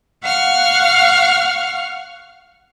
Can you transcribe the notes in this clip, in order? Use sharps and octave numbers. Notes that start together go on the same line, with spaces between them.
F5 F#5 C#6 F6